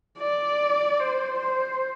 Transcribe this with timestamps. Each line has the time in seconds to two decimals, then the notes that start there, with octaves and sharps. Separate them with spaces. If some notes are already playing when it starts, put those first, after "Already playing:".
0.18 D5
1.00 C5
1.40 C5